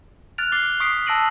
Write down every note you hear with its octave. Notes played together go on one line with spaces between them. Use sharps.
F6 F#6 A6 D7 F7
D6 A6 C7 G7
C#6 D#6 B6 C7 D7
A5 E6 A#6 D7 D#7 F#7